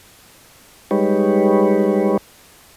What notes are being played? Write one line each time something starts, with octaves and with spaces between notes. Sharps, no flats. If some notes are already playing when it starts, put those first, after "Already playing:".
G3 G#3 D#4 G4 B4 C#5